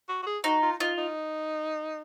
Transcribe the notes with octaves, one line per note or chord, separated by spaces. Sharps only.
F#4
F#4
G#4
D#4 F#4
F4
D#4 F4
D#4